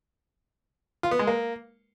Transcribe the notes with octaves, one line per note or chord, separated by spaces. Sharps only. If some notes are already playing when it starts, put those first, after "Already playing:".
F4
B3
G#3
A#3